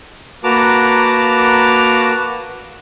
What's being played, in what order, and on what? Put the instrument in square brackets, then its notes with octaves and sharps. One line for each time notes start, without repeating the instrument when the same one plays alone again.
[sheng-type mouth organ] A#3 F#4 B4 A5 A#5 D6